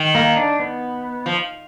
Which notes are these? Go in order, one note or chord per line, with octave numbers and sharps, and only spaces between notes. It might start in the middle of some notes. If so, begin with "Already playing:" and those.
Already playing: D#3
A#3
D4
B3
F3